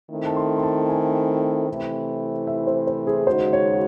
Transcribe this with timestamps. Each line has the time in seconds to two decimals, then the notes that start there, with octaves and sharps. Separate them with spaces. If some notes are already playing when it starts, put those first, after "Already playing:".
0.11 D#3 A3 C4 E4 A4
0.26 A5
0.36 C6
0.58 C6
0.63 A5
0.89 G#5
1.68 C3 E3 A3 C4 E4
2.47 E5
2.67 C5
2.87 C5
3.07 G#4
3.26 D#2 C#3 G#3 D#4 F#4 C5
3.53 C#5